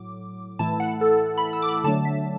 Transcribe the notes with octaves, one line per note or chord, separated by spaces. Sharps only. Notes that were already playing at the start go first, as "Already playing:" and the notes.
Already playing: A2 F#3 D6
A2 E3 A3 E4 A5
F#5
A4
B5
E6
D6
B5
D3 F#3 A3 D4 A5
E5